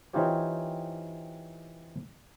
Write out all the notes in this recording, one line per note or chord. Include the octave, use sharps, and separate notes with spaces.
E3 C4 D#4 F4 G4 C#5